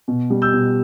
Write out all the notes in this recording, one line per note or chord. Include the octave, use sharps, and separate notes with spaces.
B2
G3
E6 G6
B2